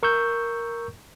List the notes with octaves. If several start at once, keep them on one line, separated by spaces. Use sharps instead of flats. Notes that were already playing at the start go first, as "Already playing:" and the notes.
A#4 C#6 E6 G6